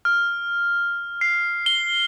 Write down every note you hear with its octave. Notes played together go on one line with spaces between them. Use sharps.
F6
C7
G7